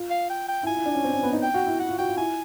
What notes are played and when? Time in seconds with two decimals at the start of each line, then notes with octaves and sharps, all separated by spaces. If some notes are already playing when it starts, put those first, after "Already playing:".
Already playing: F4
0.10 F5
0.30 G5
0.48 G5
0.63 E4
0.67 F4 G#5
0.76 E4
0.86 D4
0.95 C#4
1.04 C4
1.14 C#4
1.23 B3
1.33 D#4
1.43 G5
1.54 F#4
1.66 E4
1.80 E4 F#5
1.89 F4
1.98 F#4 G5
2.08 F4
2.17 E4 G#5